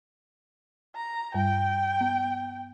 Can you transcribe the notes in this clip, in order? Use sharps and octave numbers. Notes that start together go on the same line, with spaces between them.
A#5
G2 G3 G5
B3